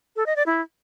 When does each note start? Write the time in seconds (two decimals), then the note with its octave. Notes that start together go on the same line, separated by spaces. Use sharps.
0.16 A4
0.26 D#5
0.36 D5
0.46 E4